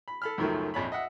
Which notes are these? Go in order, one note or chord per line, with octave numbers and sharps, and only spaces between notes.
B5
A4 B5 F6
C#2 F#2 D#3 F3 F#3 A3
A#1 F2 C#5 B5
D#5 E5 F#5